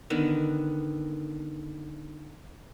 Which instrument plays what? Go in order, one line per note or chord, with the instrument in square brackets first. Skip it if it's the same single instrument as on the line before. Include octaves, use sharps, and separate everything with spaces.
[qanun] D3 D#3 B3